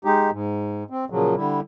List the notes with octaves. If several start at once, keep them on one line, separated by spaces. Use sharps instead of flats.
G#3 D#4 G4
G#2
C4
A#2 C#3 F3 F#3
D3 G3 E4